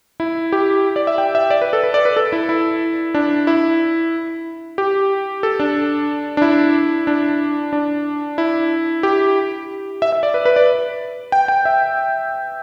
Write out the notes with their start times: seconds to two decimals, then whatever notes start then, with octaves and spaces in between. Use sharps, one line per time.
0.20 E4
0.52 G4
0.96 D5
1.07 E5
1.18 G5
1.35 E5
1.50 D5
1.61 B4
1.73 A4
1.83 B4
1.94 D5
2.05 B4
2.17 A4
2.32 E4
2.49 E4
3.14 D4
3.47 E4
4.78 G4
5.43 A4
5.60 D4
6.37 D4
6.42 E4
7.07 D4
7.73 D4
8.38 E4
9.03 G4
10.02 E5
10.12 E5
10.23 D5
10.34 B4
10.45 B4
10.56 D5
11.32 G5
11.48 G5
11.65 E5